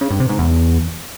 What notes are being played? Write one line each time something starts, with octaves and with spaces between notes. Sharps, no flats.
C#3
G2
C3
G#2
E2